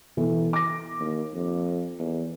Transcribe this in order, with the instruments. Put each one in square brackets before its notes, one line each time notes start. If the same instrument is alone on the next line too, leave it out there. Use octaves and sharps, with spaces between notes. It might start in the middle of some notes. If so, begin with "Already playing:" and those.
[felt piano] B2 E3 A4
D6 A#6
[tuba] D#2
F2
E2